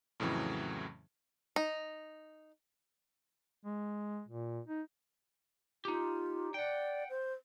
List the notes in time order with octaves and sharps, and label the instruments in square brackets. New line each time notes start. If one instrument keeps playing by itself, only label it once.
[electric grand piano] F2 A2 C#3 E3 F#3
[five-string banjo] D#4
[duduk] G#3
A#2
D#4
[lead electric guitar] D#4 G4 [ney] F4
[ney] D5 [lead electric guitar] F#5 G5
[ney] C5